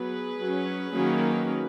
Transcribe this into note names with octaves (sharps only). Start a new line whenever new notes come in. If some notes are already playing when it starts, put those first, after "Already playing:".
Already playing: F#3 B3 G#4 B4
F#3 C#4
D#3 F#3 A#3 C#4